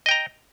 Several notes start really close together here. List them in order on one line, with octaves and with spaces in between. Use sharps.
D#5 G5 A#5